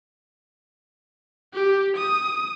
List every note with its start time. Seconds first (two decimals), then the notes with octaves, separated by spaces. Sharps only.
1.54 G4
1.97 D#6